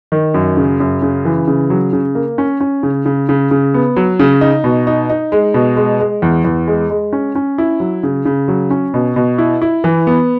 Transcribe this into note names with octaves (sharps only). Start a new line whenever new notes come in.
D#3
F#2
C#3
F#2
C#3
E3
C#3
F#3
C#3
A#3
C#4
C#4
C#3
C#3
C#3
C#3
B3
F#3
C#3
D#4
B2
D#4
D#4
G#3
B2
G#3
G#3
E2
E2
G#3
G#3
C#4
C#4
E4
F#3
C#3
C#3
F#3
C#4
B2
B2
E4
E4
E3
B3